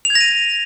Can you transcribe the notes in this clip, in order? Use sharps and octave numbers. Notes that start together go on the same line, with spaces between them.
F7
G#6
A#6
D#7